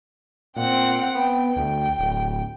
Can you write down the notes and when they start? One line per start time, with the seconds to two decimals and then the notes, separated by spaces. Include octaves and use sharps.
0.56 A#2 C4 F#5 G5
1.15 B3 G5
1.56 D2 G5
1.98 D1